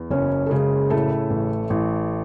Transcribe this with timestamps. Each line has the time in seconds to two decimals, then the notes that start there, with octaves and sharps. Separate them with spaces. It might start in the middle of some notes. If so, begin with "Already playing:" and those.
Already playing: E2
0.10 F#1 C#4
0.46 A4
0.51 C#3 G#3 G#4
0.90 A2 A3 A4
1.30 A1
1.70 A1